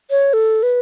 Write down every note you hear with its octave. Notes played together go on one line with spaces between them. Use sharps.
C#5
A4
B4